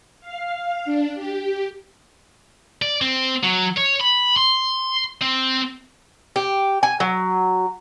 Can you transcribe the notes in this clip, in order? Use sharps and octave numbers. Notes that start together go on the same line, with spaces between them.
F5
D4
G4
D5
C4
F#3
C#5
B5
C6
C4
G4
G#5
F#3